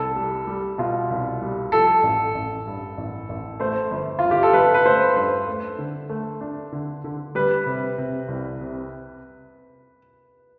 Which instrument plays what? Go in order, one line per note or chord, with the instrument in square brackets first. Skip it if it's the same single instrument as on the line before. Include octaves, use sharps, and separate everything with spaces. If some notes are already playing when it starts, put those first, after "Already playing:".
Already playing: [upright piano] C2 [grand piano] A4
[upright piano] G3
G3
[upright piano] B2 [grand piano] F4
[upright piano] C2
G3
[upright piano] F3 [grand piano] A4
[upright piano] A1
A1
G2
A1
A1
[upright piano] A3 [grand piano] C5
[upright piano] G1
[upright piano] G1 [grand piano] F4
[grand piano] G4
A4
[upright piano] G1 [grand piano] B4
[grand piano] B4
[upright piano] A3 [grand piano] C5
[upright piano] G2 [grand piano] C5
[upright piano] A3
D3
A3
D4
D3
D3
[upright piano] G3 [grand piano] B4
[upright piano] C3
C3
C2
C3